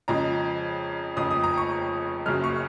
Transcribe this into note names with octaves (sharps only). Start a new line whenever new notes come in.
F2 C#3 F3 G#3 A#5
F1 F2 C#3 F3 D#6
D#6
A#5
C#6
F#1 F#2 C#3 F#3 F6
C#6